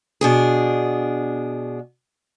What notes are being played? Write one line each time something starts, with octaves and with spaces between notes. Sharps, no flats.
B2 D4 G#4